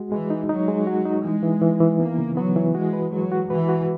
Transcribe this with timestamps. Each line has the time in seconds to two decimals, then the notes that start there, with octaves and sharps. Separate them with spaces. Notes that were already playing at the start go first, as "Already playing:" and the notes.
Already playing: G#3 F#4
0.11 E3 G#3
0.30 D#4
0.49 F#3 D#4
0.68 G#3
0.87 F#4
1.06 D#4
1.24 E3 G#3
1.43 E3
1.62 E3
1.81 E3
2.00 A#3 B3
2.18 C#3
2.37 F#3 B3
2.56 E3
2.75 G#3 F#4
2.93 B4
3.12 F#3 G#3
3.32 F#4
3.50 E3 B4
3.69 F#4